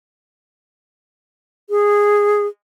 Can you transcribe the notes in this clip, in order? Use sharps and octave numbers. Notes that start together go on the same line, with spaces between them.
G#4